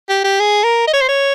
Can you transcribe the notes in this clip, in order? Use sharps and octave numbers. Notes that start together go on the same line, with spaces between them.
G4
G4
G#4
A#4
D#5
C#5
C5
C#5